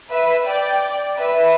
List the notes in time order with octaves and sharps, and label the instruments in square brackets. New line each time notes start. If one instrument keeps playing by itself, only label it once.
[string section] B4 E5
D5 G5
B4 E5